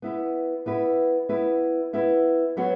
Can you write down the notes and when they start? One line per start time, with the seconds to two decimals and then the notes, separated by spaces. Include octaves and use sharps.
0.02 B3 E4 B4
0.66 B3 E4 B4
1.29 B3 E4 B4
1.93 B3 E4 B4
2.57 F#3 B3 F#4 C#5